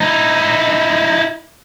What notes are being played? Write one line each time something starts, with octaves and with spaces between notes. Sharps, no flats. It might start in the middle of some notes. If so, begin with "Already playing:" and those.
D#4 E4